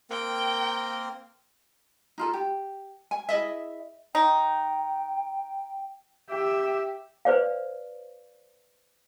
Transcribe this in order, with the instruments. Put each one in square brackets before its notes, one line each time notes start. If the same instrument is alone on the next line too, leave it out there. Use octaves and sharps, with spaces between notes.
[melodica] A#3 C4 A#4 [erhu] G5
[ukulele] D#4 F4 A4
G4
G#5
E4 G#4 D#5 E5
[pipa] D#4 [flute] G5
[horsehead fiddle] G4 E5
[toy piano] B4 C5 D5 F5